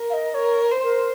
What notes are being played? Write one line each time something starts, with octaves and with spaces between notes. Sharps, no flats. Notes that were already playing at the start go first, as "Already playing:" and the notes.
Already playing: A#4
F5
D#5
A#4 C#5
C5
A#4